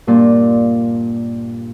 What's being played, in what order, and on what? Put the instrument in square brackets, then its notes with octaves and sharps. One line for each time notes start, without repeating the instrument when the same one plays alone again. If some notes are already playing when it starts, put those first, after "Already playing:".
[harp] G2 A#2 A#3 F4 D5